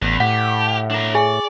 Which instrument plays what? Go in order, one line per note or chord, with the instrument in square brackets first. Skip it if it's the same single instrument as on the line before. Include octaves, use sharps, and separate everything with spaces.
[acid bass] A1 [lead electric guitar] E2
[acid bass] A2 [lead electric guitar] G4 [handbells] F#5
[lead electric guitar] D4 A#4
[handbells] G#4 G#5 [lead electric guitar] D5